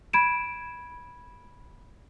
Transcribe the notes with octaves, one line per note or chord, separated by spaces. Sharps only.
B5 G#6 D7 E7